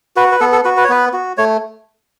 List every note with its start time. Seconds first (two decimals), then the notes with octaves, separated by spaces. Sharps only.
0.16 F#4 B4
0.32 B4
0.40 B3 A4
0.52 A4
0.64 F#4 B4
0.77 B4
0.84 C#5
0.89 B3 B4
1.13 F#4
1.37 A3 C#5